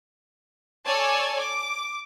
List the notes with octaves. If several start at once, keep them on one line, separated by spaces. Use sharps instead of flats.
A4 C#5 D5 G#5 A5
D6